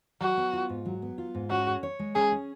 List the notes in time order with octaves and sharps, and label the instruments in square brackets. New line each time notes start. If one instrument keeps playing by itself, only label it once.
[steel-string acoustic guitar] F#3 [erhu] F#4
[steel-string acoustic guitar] B3
F4
G#2
F#3
B3
F4
G#2
[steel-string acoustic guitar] C#4 [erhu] F#4
[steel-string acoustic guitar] G#4
C#5
G#3
[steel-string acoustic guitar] C#4 [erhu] G#4
[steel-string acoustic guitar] G#4